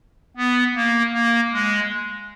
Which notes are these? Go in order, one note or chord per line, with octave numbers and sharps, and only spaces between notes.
B3
A#3
A#3
G#3